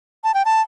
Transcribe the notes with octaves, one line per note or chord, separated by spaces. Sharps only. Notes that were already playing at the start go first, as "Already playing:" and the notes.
A5
G5
A5